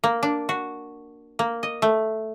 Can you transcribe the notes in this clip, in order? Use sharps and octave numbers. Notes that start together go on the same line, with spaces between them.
A#3
D4
F#4
A#3
D#5
A3